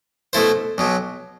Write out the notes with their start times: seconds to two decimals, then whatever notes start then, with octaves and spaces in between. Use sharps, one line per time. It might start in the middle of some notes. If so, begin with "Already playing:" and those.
0.33 B2 A3 E4 A4 C5
0.78 B1 B2 F#3